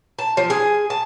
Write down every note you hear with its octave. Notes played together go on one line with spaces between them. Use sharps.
A5
F3
G#4
A5